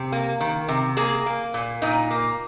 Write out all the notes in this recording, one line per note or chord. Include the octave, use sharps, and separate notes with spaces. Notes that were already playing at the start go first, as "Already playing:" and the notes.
Already playing: C3
A#3
D#3
C3
A#3 G#4
A#3
A#2
A#2 D#4
A#3